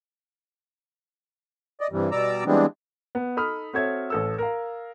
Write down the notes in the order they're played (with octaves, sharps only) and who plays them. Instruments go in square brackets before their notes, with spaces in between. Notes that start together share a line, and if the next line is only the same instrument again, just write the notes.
[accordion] D5 D#5
G2 C3 E3 G3
B2 G3 D5 A#5 D6 E6
E3 G3 G#3 B3 C4 D4
[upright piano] B3
D#4 A4 B5 D#6 F6
C4 F#4 A4 C#5 E5 G#6
A1 A4 E6
A#4 F5